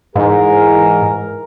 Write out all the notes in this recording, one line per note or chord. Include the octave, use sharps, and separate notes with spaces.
G#2 E3 G#4 A#4